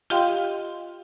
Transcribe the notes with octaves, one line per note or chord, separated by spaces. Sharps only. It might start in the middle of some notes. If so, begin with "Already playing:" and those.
F4 G4 D#5 F5 G5 C6